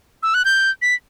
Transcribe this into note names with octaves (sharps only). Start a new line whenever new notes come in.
E6
F#6
G6
B6